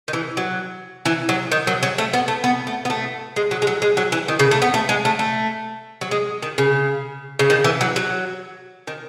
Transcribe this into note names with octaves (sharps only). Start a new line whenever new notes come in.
D#3
E3
F#3
E3
F#3
D#3
F#3
F#3
A3
B3
A3
B3
A3
B3
A3
G#3
F#3
G#3
F#3
G#3
F#3
E3
D#3
C#3
A3
B3
A3
G#3
A3
A3
F#3
G#3
D#3
C#3
C#3
D#3
E3
F#3
F#3
D#3